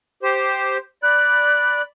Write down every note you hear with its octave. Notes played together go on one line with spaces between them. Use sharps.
G4 C5
D5 B5 F#6